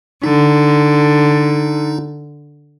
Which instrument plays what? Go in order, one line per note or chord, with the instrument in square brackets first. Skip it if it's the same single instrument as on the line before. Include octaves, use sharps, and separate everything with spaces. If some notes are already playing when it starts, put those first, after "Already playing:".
[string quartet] D3 [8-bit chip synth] D#4